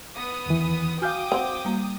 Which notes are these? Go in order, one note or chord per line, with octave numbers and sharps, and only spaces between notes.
B3 D#6
E2 D#3 E3
F#4 F5 G5 G#5 D6 D#6 F6 G6
C4 F#5 C6
G3 A#3